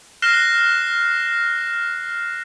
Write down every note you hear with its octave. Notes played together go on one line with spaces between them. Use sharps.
F6 F#6 A#6 C7 E7 G7